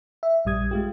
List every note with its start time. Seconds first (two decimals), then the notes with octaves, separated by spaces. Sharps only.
0.23 E5
0.45 A#1 G2 G3 D#6 G#6
0.71 G#3 F4 G4